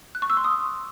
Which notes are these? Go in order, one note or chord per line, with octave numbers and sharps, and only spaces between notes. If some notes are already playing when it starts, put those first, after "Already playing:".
F#6
C#6
E6
C6
D#6